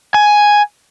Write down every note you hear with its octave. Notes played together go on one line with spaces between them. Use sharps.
G#5